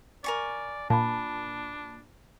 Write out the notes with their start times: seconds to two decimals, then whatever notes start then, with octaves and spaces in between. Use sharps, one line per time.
0.24 A#4 D5 G#5 C#6
0.90 A#2 D4 A5 B5